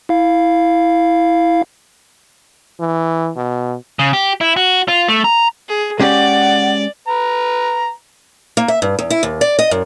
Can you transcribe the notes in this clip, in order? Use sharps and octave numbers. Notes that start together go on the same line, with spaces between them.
E4 F5
E3
B2
C#3
G4
E4
F#4
F4
A3
A#5
G#4
G#3 C#4 G4 D5 F#5
B4 A#5
A#3
E5
G2
E2
E4
D#2
D5
D#5
F#2